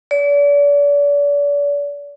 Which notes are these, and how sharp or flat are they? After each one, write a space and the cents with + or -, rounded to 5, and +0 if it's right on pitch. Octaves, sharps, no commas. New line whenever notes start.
D5 -40